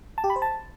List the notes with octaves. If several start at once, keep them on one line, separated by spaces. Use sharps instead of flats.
A5
G4
B5
C5
A5